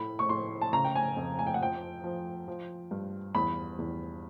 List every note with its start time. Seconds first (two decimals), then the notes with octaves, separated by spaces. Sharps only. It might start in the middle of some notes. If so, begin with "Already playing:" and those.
Already playing: A2 B5
0.19 C#6
0.29 A2 C6
0.61 A5
0.73 C#3 A#5
0.85 G5
0.96 G#5
1.17 F2
1.39 G#5
1.47 G5
1.54 F#5
1.61 F3 G5
2.04 F3
2.48 F3
2.91 G2
3.35 E2 B5
3.78 E2